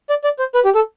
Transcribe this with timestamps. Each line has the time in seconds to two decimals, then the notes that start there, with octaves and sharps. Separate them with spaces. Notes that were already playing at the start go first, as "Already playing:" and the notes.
0.10 D5
0.24 D5
0.39 C5
0.55 B4
0.65 G4
0.75 A4